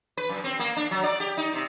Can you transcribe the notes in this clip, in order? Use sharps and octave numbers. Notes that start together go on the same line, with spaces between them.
B4
F#2
C4
A#3
D4
F#3
D5
G4
D#4
C3